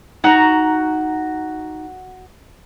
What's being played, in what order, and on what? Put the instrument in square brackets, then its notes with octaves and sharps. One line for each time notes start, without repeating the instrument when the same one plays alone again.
[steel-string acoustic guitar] D#4 A#5 [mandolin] F#4